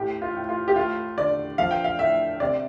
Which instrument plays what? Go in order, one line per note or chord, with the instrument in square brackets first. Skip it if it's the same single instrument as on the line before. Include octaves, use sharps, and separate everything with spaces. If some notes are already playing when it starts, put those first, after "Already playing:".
Already playing: [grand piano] A2 G4
F4
A2
F4
G4
A3 F4
D3 D5
F3 F5
G5
F5
A2 E5
C3 D5